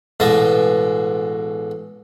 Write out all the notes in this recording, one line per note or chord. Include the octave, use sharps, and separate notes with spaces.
A1 B2 G#3 D#5 A5